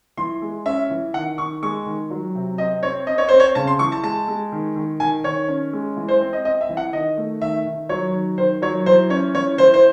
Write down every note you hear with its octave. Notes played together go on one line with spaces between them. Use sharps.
E3 C6
G#3
C#4 E5
E3
D#3 F#5
D#3 C#6
G#3 C#6
D#3
F#3
C3
C4 D#5
C4 C#5
C4 D#5
C#5
C4 C5
C#5
C#3 A5
C6
E3 C#6
A5
G#3 A5
G#3
D#3
D#3
D#3 G#5
D#3 C#5
C#4
G#3
E3
C5
C4
D#5
C4 D#5
E5
E3
F#5
D#3 D#5
A3
D#3 E5
D#3
F#3 C#5
D#3
D#3 C5
F#3 C#5
E3 C5
C#4 C#5
E3 C#5
E3 C5
C5